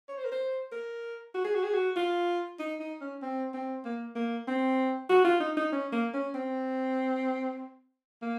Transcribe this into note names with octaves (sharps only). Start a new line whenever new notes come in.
C#5
C5
A#4
C5
A#4
F#4
G#4
F#4
G#4
F#4
F4
D#4
D#4
C#4
C4
C4
A#3
A#3
C4
F#4
F4
D#4
D#4
C#4
A#3
C#4
C4
A#3